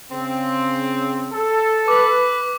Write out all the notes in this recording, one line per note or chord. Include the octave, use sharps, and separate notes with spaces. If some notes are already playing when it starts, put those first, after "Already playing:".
C#3 C4
A4
B4 D6